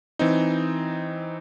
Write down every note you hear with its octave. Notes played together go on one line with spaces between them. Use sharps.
E3 C4 D#4